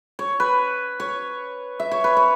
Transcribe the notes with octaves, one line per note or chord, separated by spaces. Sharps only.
C#5
B4
C#5
E5
C#5
B4
C#5